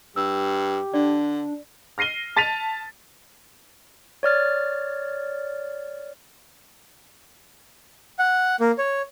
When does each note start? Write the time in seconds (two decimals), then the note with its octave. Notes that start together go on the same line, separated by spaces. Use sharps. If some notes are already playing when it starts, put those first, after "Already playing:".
0.16 G2 G4 E6
0.94 D3 D4 D5
1.98 F6 A#6 C7 D#7 G7
2.36 A5 A6 B6 D#7 F7
4.23 C#5 D5 F6 A6
8.19 F#5
8.60 A#3
8.78 C#5